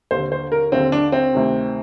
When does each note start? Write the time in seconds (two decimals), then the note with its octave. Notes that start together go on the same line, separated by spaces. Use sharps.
0.11 D#2 D3 C5
0.32 C5
0.52 A#4
0.72 D#2 D3 C4
0.92 D4
1.12 C4
1.34 D2 C3 D#3